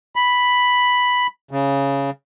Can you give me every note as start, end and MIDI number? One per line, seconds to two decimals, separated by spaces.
0.16 1.27 83
1.51 2.10 49